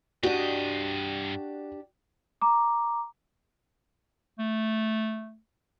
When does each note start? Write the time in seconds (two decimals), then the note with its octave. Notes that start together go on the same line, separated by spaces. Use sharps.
0.23 G2 D4 F#4 G4 D#5
2.41 A#5 D6
4.39 A3